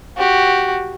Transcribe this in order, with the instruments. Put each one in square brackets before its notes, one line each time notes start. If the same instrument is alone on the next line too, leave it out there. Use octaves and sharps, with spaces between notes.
[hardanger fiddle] F#4 G4